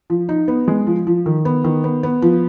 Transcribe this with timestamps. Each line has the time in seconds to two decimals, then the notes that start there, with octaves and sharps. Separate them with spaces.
0.10 F3
0.29 D#4
0.48 B3
0.68 G#3
0.87 F3
1.07 F3
1.26 D#3
1.45 B3
1.64 D#3
1.84 B3
2.03 B3
2.22 F3